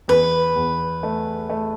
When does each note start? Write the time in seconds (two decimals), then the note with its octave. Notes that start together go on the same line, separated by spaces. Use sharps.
0.08 E2 B4
0.56 E2
1.03 A3
1.50 A3